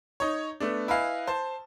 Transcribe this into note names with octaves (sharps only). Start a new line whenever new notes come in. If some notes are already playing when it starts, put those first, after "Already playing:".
D#4 C#5
A3 B3 D4
E4 B4 D#5 F5 G#5
C5 A5